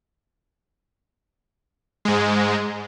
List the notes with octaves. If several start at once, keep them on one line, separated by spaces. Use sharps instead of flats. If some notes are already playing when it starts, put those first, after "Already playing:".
G#2 G#3